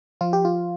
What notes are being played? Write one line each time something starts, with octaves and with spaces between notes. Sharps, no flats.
F3 F4
G4
F4